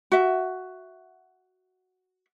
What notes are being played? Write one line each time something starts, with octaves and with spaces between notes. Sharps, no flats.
F#4 E5